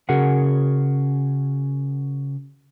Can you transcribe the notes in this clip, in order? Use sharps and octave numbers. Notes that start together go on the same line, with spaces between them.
C#3 F#4 G#4 A#4 F#5